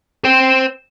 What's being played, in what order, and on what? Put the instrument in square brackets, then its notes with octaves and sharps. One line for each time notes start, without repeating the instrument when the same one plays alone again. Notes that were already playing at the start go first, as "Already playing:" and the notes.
[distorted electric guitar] C5 G5